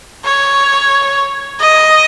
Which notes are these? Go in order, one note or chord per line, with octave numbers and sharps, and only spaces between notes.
C#5
D#5